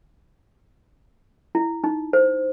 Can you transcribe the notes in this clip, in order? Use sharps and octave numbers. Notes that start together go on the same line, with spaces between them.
E4
D#4
C5